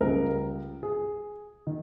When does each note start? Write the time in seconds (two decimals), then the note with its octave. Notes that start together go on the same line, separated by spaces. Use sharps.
0.01 C#2 C#3 G3 A#4
0.83 G#4
1.67 D#3